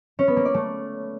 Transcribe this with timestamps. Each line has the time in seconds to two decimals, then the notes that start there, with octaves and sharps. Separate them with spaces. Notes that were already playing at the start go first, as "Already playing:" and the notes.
0.19 C#4
0.28 B3
0.37 A#3
0.45 D5
0.54 A3